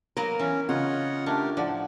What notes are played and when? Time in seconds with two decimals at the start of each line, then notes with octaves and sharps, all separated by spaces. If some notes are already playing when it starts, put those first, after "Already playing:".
0.17 F#3 A#3 B3 A#4
0.39 E3 C#4
0.69 C#3 F4 C#5 D#5 F#5
1.26 A3 D4 G4 A#4
1.57 A2 F3 D5 F#5